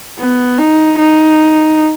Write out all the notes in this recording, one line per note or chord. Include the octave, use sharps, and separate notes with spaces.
B3
D#4
D#4